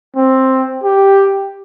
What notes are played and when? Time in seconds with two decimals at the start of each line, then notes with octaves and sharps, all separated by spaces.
0.16 C4
0.83 G4